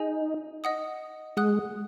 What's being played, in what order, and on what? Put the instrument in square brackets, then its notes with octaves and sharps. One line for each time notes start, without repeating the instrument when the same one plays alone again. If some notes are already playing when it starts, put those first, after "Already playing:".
Already playing: [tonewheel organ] D#4 [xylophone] G#4 D#5 G#5
[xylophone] D#5 F#5 D#6
[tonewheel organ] G#3 [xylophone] F#5 D#6 F#6